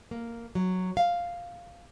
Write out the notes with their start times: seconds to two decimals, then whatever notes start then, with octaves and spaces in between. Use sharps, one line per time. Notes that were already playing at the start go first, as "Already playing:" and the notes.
0.11 A#3
0.55 F#3
0.97 F5